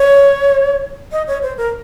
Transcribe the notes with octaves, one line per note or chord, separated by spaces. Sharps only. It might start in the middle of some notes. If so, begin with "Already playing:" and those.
Already playing: C#5
D#5
C#5
C5
A#4